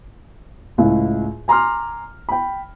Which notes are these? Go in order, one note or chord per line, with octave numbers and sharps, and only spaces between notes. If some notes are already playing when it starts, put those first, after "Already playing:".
C#2 A2
G#5 A#5 C6 D6 F6
G5 B5